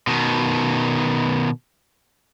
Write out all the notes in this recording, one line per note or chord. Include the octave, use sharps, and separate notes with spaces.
B2 D#3